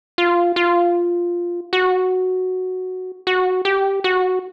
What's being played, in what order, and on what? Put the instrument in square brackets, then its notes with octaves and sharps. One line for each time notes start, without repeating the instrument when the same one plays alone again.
[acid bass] F4
F4
F#4
F#4
G4
F#4